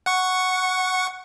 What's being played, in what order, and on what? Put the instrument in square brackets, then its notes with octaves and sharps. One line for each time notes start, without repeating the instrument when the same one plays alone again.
[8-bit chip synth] F#5 C#6